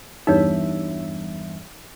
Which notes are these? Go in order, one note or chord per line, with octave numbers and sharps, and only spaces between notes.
E2 G2 D#4 C#5 E5